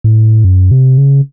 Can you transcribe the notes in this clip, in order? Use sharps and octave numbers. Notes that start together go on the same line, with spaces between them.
A2
F#2
C3
C#3